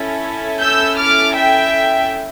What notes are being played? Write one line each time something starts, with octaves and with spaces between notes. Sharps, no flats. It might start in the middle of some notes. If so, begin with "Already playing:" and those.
Already playing: C#4 E4 A4
E6 G6
D6 F6
E5 G5